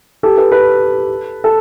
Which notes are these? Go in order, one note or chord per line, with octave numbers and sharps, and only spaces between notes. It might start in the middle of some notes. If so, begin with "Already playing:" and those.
G4 A4
A4 B4
A4 B4
A4